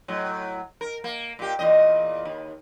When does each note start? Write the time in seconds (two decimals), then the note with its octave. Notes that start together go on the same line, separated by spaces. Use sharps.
0.08 A2 F#3
0.81 A#4
1.04 A#3
1.39 A#2 G4
1.59 E2 A#2 D#5
2.25 D#2